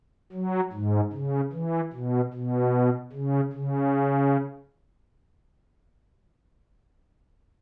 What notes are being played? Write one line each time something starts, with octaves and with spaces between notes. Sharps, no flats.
F#3
G#2
C#3
E3
B2
B2
C#3
C#3